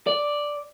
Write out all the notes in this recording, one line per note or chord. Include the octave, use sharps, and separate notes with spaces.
D5